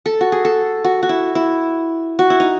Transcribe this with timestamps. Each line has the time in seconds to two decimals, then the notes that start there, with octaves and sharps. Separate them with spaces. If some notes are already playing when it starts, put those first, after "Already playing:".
0.06 A4
0.21 F#4
0.32 G#4
0.45 A4
0.84 F#4
1.03 F#4
1.09 E4
1.35 E4
2.19 F#4
2.30 E4
2.40 D#4